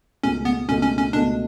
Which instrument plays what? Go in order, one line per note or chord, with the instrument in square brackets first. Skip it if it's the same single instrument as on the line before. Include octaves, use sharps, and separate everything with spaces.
[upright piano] C#2 B2 A3 [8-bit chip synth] C#4
[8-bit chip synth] B3
[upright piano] C#2 B2 A3 [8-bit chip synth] C#4
[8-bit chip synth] C#4
C#4
[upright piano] C#2 B2 A3 [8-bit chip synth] D4